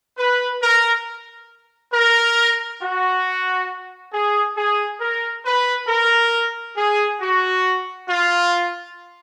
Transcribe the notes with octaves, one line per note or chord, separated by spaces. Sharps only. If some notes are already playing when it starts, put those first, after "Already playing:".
B4
A#4
A#4
F#4
G#4
G#4
A#4
B4
A#4
G#4
F#4
F4